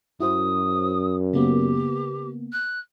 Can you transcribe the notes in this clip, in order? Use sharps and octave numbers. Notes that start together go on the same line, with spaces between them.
F#2 E4 F#4 C5 D#6
C#3 A#3 B3 G4
F#6